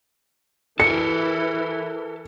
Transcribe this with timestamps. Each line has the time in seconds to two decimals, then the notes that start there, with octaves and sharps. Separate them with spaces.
0.80 E3 A4 A#4 C#7